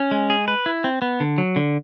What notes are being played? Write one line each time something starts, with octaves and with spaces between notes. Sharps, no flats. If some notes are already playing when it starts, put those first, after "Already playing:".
Already playing: C#4
G#3
G#4
B4
E4
C4
B3
D3
F#3
D3